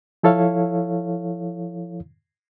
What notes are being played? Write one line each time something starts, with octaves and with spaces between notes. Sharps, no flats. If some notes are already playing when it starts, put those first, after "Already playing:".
F3 E4 A4 C#5 F5